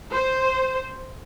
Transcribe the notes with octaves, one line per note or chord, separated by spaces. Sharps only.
C5